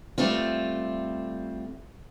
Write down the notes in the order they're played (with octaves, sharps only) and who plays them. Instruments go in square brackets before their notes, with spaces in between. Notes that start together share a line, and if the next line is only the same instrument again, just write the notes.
[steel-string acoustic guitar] G3 A3 C4 F4